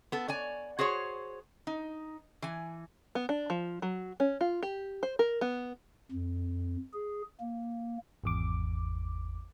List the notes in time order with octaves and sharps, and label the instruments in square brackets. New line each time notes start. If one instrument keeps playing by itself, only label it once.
[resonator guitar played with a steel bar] B3 A4
C#5 D5 G#5
F#4 G#4 C5 C#5
D#4
E3 G#5
[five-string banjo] B3
D4
F3
F#3
C#4
F4
G4
C5
A#4
B3
[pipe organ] F2
G#4
A#3
[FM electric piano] G#1 E2 D6